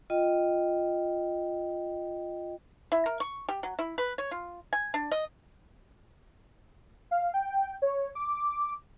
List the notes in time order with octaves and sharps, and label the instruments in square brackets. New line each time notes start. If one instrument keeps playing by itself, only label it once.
[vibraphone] F4 D#5 G5
[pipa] E4
A#4
C#6
G4
F#3
E4
B4
C#5
F4
G#5
D4
D#5
[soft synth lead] F5
G5
C#5
D6